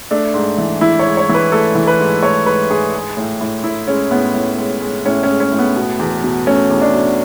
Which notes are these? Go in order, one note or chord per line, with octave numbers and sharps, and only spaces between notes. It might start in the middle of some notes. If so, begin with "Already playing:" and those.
A3 D4
G#2
E3
E3 E4
C#5
G#2
C#5
E3
B4
A3 A4
E3
B4
G#2
A3 C#5
G#2 B4
G#2 G#4
G#3
A2
A2
A2 E4
G#3 C#4
A2 B3
A2
G#3
G#3
A2 C#4
C#4
G#3
C#4
A2
B3
B2
E2
B2
A3 C#4
E2
D4
B2